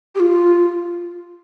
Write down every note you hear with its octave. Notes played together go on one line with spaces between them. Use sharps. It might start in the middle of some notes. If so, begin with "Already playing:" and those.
G4
F4